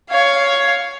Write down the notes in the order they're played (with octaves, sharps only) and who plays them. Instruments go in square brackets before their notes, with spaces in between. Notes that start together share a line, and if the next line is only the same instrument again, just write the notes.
[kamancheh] C#5 F5